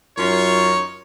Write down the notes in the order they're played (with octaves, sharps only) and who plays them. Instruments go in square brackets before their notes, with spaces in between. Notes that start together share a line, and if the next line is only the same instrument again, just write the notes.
[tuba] F#2 [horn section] D#4 A#4 C#5 [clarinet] F4